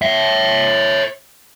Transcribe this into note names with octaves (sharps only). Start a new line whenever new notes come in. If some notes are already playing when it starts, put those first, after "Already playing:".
C#5 E5